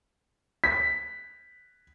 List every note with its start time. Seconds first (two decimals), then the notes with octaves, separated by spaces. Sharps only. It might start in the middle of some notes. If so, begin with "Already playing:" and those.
0.64 B6